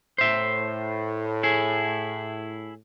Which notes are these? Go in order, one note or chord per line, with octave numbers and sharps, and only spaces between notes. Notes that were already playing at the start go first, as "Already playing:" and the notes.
A2 C5 E5
E4 G#4